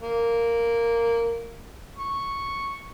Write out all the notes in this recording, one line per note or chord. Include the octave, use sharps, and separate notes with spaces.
A#3
C#6